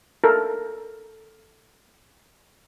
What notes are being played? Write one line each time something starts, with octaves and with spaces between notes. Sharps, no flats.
A4 A#4